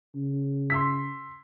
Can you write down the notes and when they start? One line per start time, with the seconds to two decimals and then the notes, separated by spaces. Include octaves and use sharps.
0.15 C#3
0.70 C6 E6 B6